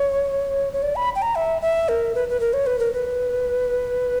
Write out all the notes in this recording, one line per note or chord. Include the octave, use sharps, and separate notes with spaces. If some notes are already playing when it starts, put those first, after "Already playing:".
Already playing: C#5
C#5
D5
B5
G5
A#5
E5
E5
A#4
B4
B4
A#4
C#5
B4
A#4
B4